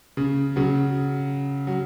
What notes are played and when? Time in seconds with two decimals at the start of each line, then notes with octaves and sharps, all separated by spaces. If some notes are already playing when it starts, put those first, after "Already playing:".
0.17 C#3
0.56 C#3 F#3
1.67 F#3